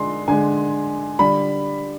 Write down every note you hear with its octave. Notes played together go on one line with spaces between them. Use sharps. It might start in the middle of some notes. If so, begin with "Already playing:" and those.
Already playing: D3 G#3 C6
D3 G#3 G#5
D3 G3 B5